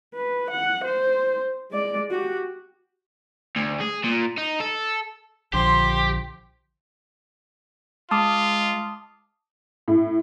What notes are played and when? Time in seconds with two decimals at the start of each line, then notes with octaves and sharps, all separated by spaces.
0.15 B4
0.51 F#5
0.85 C5
1.72 G#3 D5
2.10 F#4 G4
3.56 D2
3.81 G#4
4.04 A#2
4.38 D#4
4.60 A4
5.53 A#1 D3 F3 G4 C5 C6
8.11 G#3 F4 A5 D6 D#6
9.88 A2